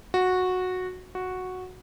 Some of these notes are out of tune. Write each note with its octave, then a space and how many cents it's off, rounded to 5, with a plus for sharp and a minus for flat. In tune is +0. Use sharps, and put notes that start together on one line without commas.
F#4 -10
F#4 -5